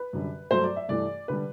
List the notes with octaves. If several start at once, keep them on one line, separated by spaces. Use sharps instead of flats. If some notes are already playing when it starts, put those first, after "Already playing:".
Already playing: B4
F#2 D3 G3
G2 F#3 A3 C5
D5
E5
G2 E3 A3 D5
D3 G3 B4